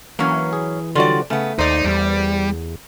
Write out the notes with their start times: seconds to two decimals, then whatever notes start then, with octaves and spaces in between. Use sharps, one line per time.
0.19 E3 F#3 A#3 C#4
0.53 G#4
0.96 D3 F#3 G3 F4 F#4 D5
1.30 C#3 A3 B3
1.59 D#2 D#4 C5 D5
1.85 E2 G3